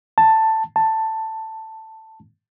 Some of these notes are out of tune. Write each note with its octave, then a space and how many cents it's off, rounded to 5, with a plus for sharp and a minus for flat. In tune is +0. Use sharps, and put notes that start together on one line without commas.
A5 +10
A5 +10